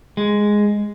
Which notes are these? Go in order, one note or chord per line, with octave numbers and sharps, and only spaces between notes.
G#3